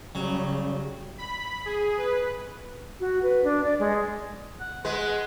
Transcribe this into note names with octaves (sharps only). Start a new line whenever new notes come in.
C#3 F#3 G3
B5
G#4
B4
F#4
B4
D4
D5
G#3
F#5
G#3 B4